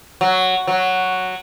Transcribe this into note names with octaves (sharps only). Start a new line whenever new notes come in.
F#3
F#3